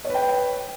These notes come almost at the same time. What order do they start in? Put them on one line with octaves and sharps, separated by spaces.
C#5 B4 G5